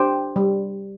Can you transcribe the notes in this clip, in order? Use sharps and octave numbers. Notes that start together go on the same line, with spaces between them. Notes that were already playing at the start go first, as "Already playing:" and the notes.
Already playing: D4 G4 C5 G5
G3